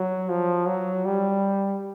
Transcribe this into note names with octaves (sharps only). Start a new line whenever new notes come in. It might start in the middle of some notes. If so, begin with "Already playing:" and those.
Already playing: F#3
F3
F#3
G3